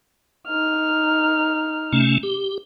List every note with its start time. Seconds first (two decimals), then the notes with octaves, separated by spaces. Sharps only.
0.48 D#4 F6
1.93 C3 A3 C#4
2.23 G4